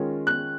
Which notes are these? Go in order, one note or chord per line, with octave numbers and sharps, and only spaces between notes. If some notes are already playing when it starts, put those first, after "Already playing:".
Already playing: D#3 G#3 C#4 F4
F#6